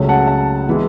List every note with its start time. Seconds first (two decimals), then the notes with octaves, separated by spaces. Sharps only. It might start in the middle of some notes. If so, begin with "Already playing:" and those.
Already playing: C#2 C#3 F#3 A3
0.09 F#5 A5
0.27 F#5 A5
0.69 E3 G#3